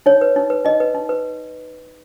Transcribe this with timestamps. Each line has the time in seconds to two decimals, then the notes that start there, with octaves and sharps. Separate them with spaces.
0.06 D#4 C#5
0.21 B4
0.36 D#4
0.50 B4
0.65 D#4 D#5
0.80 B4
0.95 D#4
1.09 B4